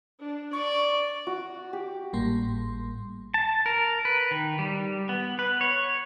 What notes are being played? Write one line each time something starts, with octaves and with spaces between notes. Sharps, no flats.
D4
D5 C#6
F#4
G4
G#1 A2 G3 A#3 C6
A5
A#4
B4
D#3
G3
B3
B4
C#5